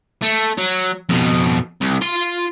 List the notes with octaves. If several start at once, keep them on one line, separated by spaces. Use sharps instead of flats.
A3
F#3
F2 B2
C2
F4 C6